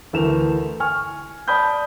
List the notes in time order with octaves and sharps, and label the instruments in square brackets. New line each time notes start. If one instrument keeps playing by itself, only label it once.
[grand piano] D2 E3 A3 A#4 E7 F7
G#5 C#6 F6
D5 A5 B5 D#6 G6